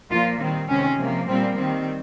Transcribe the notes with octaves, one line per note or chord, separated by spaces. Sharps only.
A#2 F3 A#3 F4
D#3 G3 C4 D#4
C3 D#3 G#3 C4 C#4
C3 F3 A#3
A#2 G3 A#3 C4
D#3 G3 C4